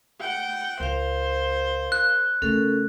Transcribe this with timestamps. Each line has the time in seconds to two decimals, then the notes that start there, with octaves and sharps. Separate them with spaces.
0.20 F#5 G5
0.80 C#2 A#4 C5 F5
1.92 F#6
2.42 C#3 A3 C#4 A4 A#4